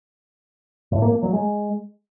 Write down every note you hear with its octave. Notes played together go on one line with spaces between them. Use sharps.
A2
A#3
A#3
F#3
G#3